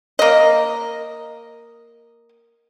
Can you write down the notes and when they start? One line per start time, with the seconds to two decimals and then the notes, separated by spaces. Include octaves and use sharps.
0.19 A#3 D#5